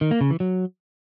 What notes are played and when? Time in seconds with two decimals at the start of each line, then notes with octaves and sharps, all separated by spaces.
0.01 D#3
0.11 A#3
0.21 C#3
0.30 E3
0.40 F#3